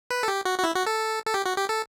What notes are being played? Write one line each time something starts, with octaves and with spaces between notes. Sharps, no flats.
B4
A4
G4
F#4
F#4
E4
F#4
A4
A4
G4
F#4
G4
A4